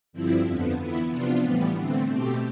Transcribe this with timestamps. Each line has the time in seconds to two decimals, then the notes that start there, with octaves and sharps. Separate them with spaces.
0.13 G2 D3 F3 C4 E4
0.44 F2 D3 F3 B3
0.78 E3 B3 E4
1.10 C3 F3 B3 D4 F4
1.43 A2 E3 G3 B3
1.76 D3 A3 C4
2.09 B2 A3 C4 G4